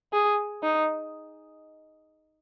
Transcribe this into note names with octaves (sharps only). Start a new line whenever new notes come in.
G#4
D#4